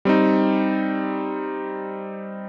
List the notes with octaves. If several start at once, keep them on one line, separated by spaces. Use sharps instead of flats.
G3 C4 D#4